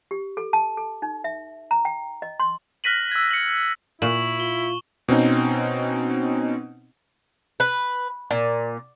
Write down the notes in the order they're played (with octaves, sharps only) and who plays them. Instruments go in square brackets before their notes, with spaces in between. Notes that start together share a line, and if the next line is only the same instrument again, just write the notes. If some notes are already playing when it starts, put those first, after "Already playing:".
[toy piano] G4
A4
A5
A4
D#4
E5
A#5
G5
D#5
C6
[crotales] F6 F#6 A#6 B6 D#7 F#7
E6 G#6
C#7 F#7
[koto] A#2 [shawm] E4 [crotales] C#6 E7 F#7
[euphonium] F4 [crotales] G7
[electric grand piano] B2 C4 C#4 D#4
[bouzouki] B4
A#2